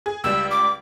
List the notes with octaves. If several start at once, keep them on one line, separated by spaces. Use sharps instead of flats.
G#4
C#2 G3 E6
D6